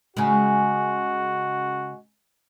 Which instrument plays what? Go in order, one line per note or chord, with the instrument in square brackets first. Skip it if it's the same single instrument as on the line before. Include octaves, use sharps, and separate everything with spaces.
[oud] C#3 G#3 [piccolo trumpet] F#4